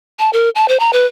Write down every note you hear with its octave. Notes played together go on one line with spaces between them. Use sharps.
A5
A#4
A5
C5
A#5
B4